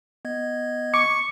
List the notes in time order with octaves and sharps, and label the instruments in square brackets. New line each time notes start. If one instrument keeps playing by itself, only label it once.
[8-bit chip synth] B3 D#5 G#6
[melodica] C#6 [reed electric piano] D6 [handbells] C#7